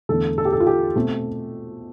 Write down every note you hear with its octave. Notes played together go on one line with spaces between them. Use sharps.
E2 D3 A3 A4
A4
G4
A4
F4
G4
B2 A3 C4